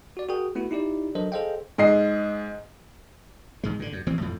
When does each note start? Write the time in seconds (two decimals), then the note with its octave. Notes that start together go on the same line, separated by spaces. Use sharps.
0.17 F#4 D5
0.29 F#4 G#4 A#4 G5 D#6
0.55 A3 B3 E4 F#4
0.71 D#4 E4 G4 D5
1.15 F#3 D4 A4 A#4 C5 D#5
1.32 G#4 A4 C5 D#5 F5 G5
1.78 G#2 D#5 C7
3.64 G#1 G#2 G#3
3.79 A2 D3
3.93 F#2
4.07 A1 E3 C4
4.21 F2 A2 F3